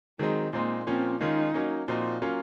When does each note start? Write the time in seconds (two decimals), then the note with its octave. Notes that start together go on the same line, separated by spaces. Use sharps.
0.19 D#3 F#3 G#3 C4 D#4
0.53 A#2 G#3 A#3 C4 D#4
0.87 A#2 F3 A#3 C4 C#4
1.20 D#3 G#3 C#4 D#4 F4
1.54 F#3 A#3 C#4
1.88 A#2 F3 C4 D#4 F#4
2.22 F#3 A#3 C#4 F4